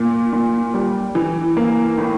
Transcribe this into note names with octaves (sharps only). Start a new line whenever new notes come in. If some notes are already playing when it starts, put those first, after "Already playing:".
Already playing: A#2
A#2
G3
E3
A#3
A2